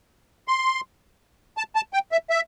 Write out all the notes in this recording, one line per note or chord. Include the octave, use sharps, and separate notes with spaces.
C6
A5
A5
G5
E5
E5